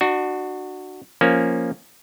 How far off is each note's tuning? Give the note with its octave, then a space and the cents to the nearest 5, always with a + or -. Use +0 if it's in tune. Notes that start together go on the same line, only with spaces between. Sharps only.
D4 +35 F#4 +0
F3 +0 A#3 +0 C#4 +0